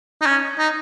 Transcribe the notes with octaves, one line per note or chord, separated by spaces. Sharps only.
D#4
C#4
D#4